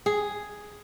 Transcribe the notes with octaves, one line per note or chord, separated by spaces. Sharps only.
G#4